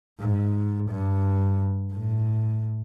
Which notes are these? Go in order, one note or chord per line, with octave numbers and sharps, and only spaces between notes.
G#2
G2
A2